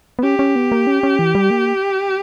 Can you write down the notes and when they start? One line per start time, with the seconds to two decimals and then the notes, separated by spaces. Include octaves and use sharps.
0.19 B3
0.23 C#4 G4
0.39 C#4
0.56 B3
0.72 A#3
0.87 C#4
1.03 C#4
1.19 E3
1.35 G3
1.50 A#3